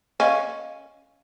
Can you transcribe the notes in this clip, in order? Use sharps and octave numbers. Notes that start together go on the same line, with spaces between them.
C#4 D#5 F5